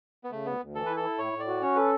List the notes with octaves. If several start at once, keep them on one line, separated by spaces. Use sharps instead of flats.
B3
C#3 A3
D2 B3
D2
E3 A4
E4 B4
A4
E4
A2 C#5
A2
D5
F#4
C#4 C#5
A4 B4